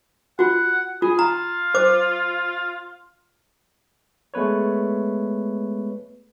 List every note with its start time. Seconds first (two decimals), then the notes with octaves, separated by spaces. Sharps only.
0.39 F4 F#4 F#5
1.02 F4 G#4
1.19 F4 A#5
1.74 C5 D6
4.34 G#3 A3 B3 B4 C#5